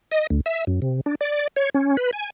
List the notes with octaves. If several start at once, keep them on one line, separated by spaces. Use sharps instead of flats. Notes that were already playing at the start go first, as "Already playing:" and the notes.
D#5
D2
E5
F#2
C3
D4
D5
C#5
C#4
B4
G#5